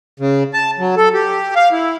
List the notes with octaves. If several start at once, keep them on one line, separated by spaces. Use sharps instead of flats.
C#3
A5
F#3
A4
G4
F5
E4